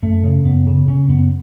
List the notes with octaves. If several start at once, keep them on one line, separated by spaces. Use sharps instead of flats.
F#2 A3
C#3
F#2 B3
C#3
C#3 C#4
F#2 B3